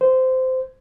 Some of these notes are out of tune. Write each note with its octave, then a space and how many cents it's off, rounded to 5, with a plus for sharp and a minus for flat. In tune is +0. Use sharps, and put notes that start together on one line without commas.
C5 -15